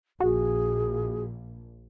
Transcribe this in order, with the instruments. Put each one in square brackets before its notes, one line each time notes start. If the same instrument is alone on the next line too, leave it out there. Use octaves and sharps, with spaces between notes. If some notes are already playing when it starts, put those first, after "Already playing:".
[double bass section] A#1 [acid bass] F#4 [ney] G#4